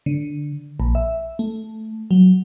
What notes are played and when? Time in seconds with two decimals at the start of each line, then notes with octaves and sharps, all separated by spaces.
0.06 D3
0.80 A#1
0.95 E5
1.39 A3
2.11 F#3